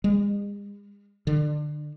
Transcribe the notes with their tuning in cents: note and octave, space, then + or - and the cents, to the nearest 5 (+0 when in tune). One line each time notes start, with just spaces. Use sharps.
G#3 -40
D3 +25